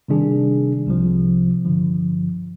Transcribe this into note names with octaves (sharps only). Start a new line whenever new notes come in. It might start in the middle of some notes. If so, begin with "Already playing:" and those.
C3 D#3 G3 D4 G#4
C2 C3 F3
G2 D3 F3